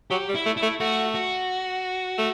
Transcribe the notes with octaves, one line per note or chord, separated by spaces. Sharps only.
F#3 G4
G3
E4
A3
E4
A3
A3 F#4
F#4
A3